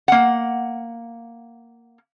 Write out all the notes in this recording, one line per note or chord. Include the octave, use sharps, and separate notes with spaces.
A#3 F#5